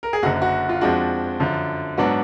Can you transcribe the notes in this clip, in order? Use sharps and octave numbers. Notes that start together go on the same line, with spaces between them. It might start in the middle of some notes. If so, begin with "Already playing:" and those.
A#4
G#4
F#1 F#2 D3 F#4
F#4
F4
F2 F3 G#3 D4 F#4
F#2 D3 F3
G#2 F#3 B3 D4 F#4